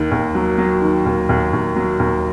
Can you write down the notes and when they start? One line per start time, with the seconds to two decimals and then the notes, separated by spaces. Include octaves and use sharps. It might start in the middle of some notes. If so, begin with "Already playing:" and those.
Already playing: D#2 D#3
0.11 D#2
0.35 F#3
0.58 F#3
0.82 D#3
1.06 D#2
1.29 D#2
1.53 D#2
1.76 F#3
1.99 D#2